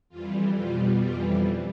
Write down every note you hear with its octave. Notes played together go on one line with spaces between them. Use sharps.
F2 E3 G3 F4
B2 G3 F4
F2 E3 G3 F4